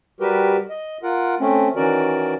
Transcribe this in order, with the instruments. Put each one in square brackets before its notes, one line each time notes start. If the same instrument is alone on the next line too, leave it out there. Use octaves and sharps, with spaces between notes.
[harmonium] G3 F#4 G4 A#4 B4
D#5
F4 A#4 F#5
A3 C4 C#4
D#3 E3 C#4 F#4 A#4 D5